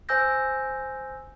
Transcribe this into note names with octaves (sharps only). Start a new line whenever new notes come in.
C5 G#5 E6 G6 A#6